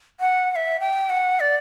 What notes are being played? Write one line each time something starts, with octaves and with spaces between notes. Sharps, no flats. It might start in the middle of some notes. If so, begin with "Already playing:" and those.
F#5
F#5
E5
G5
F#5
D5